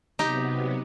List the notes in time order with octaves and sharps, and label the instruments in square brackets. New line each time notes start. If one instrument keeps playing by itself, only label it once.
[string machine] C3 F#3 B3 [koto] D#4 G4